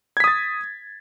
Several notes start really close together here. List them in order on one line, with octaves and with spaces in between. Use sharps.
G#6 B6 D#6 A6